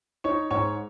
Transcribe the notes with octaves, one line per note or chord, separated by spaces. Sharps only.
D#4 C#5 C#6
G#2 C#5 C#6